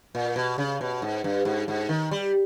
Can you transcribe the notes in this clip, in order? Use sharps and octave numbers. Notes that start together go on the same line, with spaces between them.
A#2
B2
C#3
B2
G#2
G2
G#2
G#2
D#3
G3